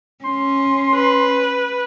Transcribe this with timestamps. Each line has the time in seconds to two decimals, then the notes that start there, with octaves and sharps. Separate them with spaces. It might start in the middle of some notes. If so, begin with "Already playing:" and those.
0.25 C#4 C6
0.95 B4